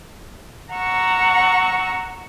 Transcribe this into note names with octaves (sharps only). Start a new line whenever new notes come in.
F#5 A#5 C#6 E6